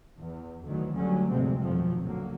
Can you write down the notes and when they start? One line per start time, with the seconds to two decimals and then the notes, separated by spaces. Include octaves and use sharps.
0.18 E2
0.66 D2 D#3 E3 F#3
0.95 D2 F#3 G3 C#4
1.30 F1 D2 G2 C3 G#3 C4
1.59 F2 B2 D#3 F3 F#3
2.00 C#2 A#2 D3 F#3 A#3